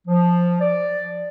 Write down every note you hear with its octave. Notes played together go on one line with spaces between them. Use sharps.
F3
D5